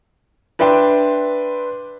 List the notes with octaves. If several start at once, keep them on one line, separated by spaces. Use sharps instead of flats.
D4 B4 E5 G5 C6